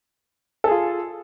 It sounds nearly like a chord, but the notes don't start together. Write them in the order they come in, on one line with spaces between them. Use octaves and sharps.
A4 G#4 F4